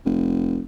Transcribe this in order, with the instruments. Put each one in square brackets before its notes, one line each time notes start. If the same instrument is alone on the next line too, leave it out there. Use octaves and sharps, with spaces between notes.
[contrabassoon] F1